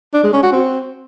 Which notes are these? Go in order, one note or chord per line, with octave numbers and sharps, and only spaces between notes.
D4
G#3
C#4
F#4
C4